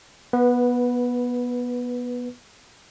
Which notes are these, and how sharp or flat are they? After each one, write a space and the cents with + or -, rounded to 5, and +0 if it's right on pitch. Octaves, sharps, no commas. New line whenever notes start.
B3 -20 B4 +0